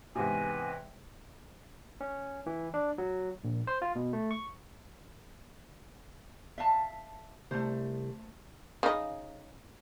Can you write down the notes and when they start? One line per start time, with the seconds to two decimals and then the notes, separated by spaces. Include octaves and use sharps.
0.15 E2 G#2 C3 B4 G#5
2.01 C#4
2.46 E3
2.74 D4
2.98 F#3
3.44 A#1
3.67 C5
3.82 F4
3.95 B2
4.13 A3
4.31 C#6
6.58 E5 F5 A5
7.51 C2 A3 C5
8.83 C#3 D#4